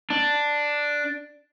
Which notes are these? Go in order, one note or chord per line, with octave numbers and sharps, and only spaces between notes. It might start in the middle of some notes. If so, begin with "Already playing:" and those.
D4